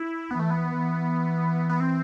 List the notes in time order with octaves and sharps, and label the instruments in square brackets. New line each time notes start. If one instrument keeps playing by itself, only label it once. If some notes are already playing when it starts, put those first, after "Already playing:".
Already playing: [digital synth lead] E4
[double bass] E3 [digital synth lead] B3
[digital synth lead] A3
B3
[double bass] E3
[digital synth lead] B3
C4